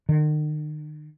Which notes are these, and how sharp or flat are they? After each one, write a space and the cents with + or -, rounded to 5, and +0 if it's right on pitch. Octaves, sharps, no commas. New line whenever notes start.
D#3 -40